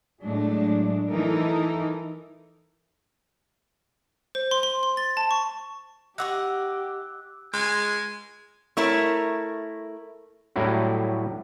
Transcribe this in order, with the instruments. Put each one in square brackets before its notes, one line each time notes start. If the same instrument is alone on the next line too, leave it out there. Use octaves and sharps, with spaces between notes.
[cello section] A2 F#3 G#3 A3 D4
E3 D#4 A4 A#4
[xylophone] C5
C6
C6
C6
A6
A5
C#6
[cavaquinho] D#4 F#5 C#6 [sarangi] G4 [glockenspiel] D6 E6 F#6
[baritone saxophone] G#3 [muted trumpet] G#5
[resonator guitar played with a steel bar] A3 E4 A#4 C#5
[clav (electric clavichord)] A2 F#3 G3 E4 F#4